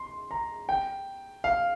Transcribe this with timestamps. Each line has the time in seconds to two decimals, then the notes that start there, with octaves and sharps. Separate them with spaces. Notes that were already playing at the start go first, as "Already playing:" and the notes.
Already playing: C6
0.31 A#5
0.69 G5
1.44 F5